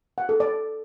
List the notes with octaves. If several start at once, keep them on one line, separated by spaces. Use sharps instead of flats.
F#5
A4
D5